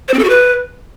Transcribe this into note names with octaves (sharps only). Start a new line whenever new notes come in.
C5
C4
A4
F#4
B4